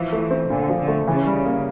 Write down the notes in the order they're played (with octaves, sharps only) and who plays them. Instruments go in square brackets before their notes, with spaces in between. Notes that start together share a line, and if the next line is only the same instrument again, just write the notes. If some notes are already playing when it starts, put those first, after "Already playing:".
Already playing: [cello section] E3 [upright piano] F3
[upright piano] A3
C4
[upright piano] A#2 [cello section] D3
[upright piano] F3
[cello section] D3
[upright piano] A3
[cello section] C#3 [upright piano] E3
[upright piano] G3
A#3